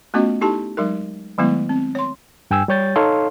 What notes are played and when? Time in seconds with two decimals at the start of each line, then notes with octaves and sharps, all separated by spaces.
0.14 A3 B3 C#4 F4 F#4 D#5
0.41 D#4 E4 G4 A4 A5
0.77 F#3 G#3 D#4 A#4
1.38 D#3 F#3 G#3 A3 B3 E4
1.69 C4
1.95 C#5 C6
2.51 G2 G5 G#5 E6
2.68 G3 G4 C#5 G6 A6
2.96 D#4 A4 C#5 F5 C6